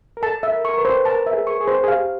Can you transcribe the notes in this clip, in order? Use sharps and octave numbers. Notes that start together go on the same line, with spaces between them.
A#4
A4 A5
E5
A#4
A#4 C#6
B4
C5
A#4 A5
E5
G#4
C#6
G#4
C5
G#4
G4 F5